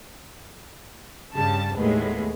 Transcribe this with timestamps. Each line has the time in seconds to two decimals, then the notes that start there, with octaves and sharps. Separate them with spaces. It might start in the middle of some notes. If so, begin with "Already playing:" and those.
1.34 G2 C#3 G3 A5
1.75 D#2 A2 G#3 B3